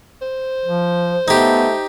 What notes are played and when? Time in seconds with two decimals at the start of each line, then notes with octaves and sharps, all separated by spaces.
0.22 C5
0.64 F3
1.28 A3 B3 D#4 G4